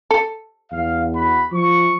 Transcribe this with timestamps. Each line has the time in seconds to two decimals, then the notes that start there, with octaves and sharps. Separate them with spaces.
0.11 A4
0.72 E2 F5
1.14 F#4 B5
1.52 F3 C#6